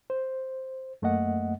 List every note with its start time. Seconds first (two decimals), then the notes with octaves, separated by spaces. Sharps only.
0.10 C5
1.02 F#2 A3 A#3 D#5 F#5